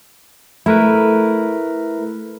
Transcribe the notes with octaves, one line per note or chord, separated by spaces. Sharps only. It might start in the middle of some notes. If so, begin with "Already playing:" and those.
A3 E4 A#4 B4